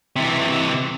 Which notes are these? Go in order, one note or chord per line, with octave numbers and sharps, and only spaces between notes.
C3 E3